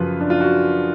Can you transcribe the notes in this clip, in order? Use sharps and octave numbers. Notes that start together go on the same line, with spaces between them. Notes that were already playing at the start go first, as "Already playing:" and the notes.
Already playing: F#2 C#3 F3 F4 B4
D4
F4
F#4